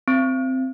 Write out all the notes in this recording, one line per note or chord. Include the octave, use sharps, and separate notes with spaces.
C4